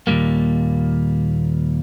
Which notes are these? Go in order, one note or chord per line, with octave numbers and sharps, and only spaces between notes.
D#2 A#2 D#3 G3 A#3